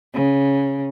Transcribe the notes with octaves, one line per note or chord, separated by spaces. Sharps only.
C#3